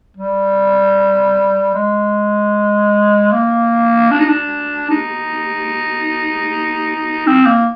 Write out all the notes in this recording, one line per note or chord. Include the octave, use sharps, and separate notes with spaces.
G3
G#3
A#3
D4
D#4
D4
D#4
C4
A#3